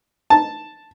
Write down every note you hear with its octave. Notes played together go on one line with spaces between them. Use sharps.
A5